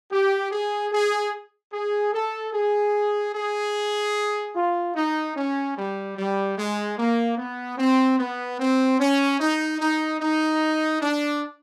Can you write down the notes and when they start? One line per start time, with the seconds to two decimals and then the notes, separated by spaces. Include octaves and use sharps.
0.11 G4
0.51 G#4
0.92 G#4
1.72 G#4
2.13 A4
2.53 G#4
3.34 G#4
4.55 F4
4.96 D#4
5.36 C#4
5.77 G3
6.17 G3
6.57 G#3
6.98 A#3
7.38 B3
7.78 C4
8.19 B3
8.59 C4
8.99 C#4
9.39 D#4
9.80 D#4
10.20 D#4
11.01 D4